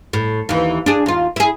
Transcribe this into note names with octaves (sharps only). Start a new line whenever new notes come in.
A2
D#2 E3
D4 G#4
D#2 F4
E4 G#4